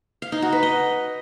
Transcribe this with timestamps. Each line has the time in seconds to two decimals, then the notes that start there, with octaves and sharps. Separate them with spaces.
0.22 F5
0.32 D#4
0.42 F#4
0.53 B4
0.63 D#5